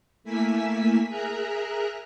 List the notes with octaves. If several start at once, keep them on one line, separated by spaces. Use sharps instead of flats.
A3 A#3 E4 G#5 E6 B6
G#4 A#4 E5 A#5 F#6